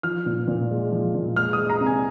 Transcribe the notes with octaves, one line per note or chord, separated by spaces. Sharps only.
F3 F6
A#2
A#2
G#3
F3
A#2
G#3 F6
G#3 D#6
A#5
C3
G#5